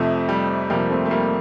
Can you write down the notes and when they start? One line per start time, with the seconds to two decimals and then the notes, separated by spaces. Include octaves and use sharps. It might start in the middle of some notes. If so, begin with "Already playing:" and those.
Already playing: F2 C3 F3 A3
0.29 G3
0.70 F2 C3 F3 G3 A#3
0.90 A3 C4
1.06 A3
1.11 G3 A#3